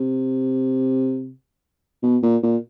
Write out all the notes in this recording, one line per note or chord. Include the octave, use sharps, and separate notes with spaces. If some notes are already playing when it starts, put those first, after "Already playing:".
Already playing: C3
B2
A#2
A#2